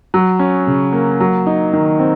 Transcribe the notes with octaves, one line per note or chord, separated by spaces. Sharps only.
F#3
C#4
C#3
A#3
F#3
D#4
D#3
C4